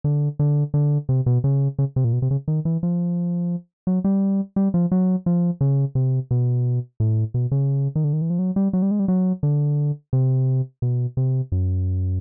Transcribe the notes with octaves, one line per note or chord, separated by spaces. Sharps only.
D3
D3
D3
C3
B2
C#3
C#3
C3
A#2
B2
C3
C#3
D#3
E3
F3
F#3
G3
G3
F3
F#3
F3
C#3
C3
B2
A2
B2
C#3
D#3
D3
D#3
E3
F3
F#3
G3
F#3
G3
G#3
G3
F#3
D3
C3
B2
C3
F#2